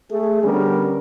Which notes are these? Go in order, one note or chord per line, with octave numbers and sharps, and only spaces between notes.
A3 G#4
D3 G3 B3 C#4 A#4